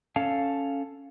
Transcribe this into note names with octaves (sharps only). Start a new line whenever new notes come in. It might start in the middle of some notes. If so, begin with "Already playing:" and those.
C#4 A4 F5 A5